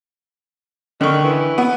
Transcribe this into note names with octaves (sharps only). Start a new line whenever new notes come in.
D3 D#3 C#6
E3
B3